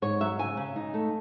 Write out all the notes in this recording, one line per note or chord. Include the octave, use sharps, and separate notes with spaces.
G#2 C#5
F#3 E5
C#3 G#5
C#3
D#4
A3